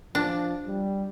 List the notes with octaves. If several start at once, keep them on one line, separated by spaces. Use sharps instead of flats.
F3 D4
G3